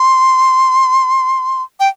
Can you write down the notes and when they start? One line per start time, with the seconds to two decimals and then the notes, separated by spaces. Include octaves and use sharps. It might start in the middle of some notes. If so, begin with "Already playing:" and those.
Already playing: C6
1.80 G5